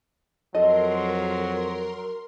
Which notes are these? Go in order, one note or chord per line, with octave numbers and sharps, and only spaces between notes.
F2 F#3 A4 A#4 D#5 C6